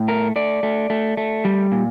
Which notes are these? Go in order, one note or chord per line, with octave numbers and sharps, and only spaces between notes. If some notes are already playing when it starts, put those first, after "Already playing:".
Already playing: A2
A3 A#4
A3 D5
A3
A3
A3
G3
A#2